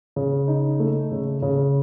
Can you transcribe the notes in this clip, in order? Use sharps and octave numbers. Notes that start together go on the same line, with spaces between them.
C#3
D#4
A3
C#3
C#3